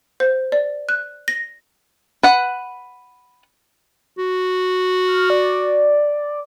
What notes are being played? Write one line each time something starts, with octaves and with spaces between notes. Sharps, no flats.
C5
D5
F#6
A#6
B4 F#5
F#4
F6
D5